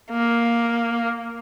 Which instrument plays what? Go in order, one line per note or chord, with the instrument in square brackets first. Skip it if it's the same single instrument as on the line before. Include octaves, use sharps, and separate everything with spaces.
[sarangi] A#3